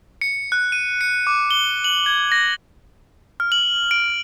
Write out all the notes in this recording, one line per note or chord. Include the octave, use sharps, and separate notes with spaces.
C#7
F#6
D#7
C#7
D6
G7
F#7
G#6
A#6
F6
F#7
D7